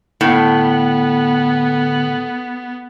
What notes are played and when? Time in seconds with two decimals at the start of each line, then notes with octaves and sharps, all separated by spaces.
0.21 A2 D3 B3